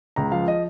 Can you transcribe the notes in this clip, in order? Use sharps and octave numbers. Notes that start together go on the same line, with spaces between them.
C#2 A#5
F3 F5
D#5